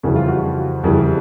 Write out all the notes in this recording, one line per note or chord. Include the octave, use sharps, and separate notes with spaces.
F2 C#3 E3 G3 F#4
F4
F#4
F2 C#3 E3 G3